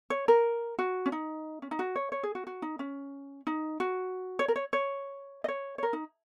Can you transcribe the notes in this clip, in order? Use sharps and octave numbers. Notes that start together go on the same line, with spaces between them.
C#5
A#4
F#4
C#4
D#4
C#4
D#4
F#4
C#5
C#5
G#4
F#4
F#4
D#4
C#4
D#4
F#4
C#5
A#4
C#5
C#5
D#5
C#5
C#5
A#4
D#4